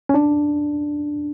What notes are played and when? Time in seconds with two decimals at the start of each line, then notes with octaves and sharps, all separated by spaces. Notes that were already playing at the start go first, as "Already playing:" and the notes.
0.09 C#4
0.14 D4